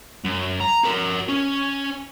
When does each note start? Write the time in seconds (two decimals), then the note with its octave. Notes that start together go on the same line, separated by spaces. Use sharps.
0.25 F#2
0.61 A#5
0.85 F#4 A#4
1.29 C#4